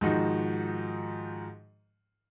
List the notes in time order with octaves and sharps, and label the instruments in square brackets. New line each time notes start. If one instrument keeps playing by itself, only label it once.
[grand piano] G#2 D#3 F3 D#4 F#4